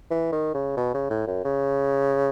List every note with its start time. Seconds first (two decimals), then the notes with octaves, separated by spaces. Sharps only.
0.10 E3
0.33 D#3
0.54 C#3
0.77 B2
0.94 C#3
1.10 A2
1.27 F#2
1.44 C#3